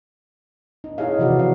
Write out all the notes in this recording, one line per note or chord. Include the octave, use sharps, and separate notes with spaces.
D#4
D#4 E4 G#4 C#5 F5
C3 E3 F3 F#4 B4 D5
F5